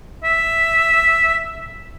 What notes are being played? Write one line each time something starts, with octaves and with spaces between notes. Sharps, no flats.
E5